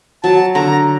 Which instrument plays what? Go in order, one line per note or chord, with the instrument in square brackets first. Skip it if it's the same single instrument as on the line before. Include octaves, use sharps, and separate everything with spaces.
[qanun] F#3 [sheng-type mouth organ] A5
[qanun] D3 [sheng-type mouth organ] A#5